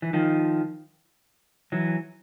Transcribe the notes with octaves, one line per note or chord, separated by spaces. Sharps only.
E3
D#3 F3
E3 F#3